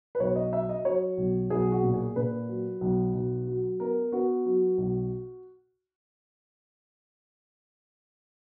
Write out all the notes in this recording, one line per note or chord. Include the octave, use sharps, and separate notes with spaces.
B4
B1 C#5
D#5
F#3 E5
D#5
F#3 C#5
B1
B1 G#4
F#4
A#2
G#4
A#2 B4
F#3
B1
B1
F#3
B3 A#4
B3 F#4
F#3
B1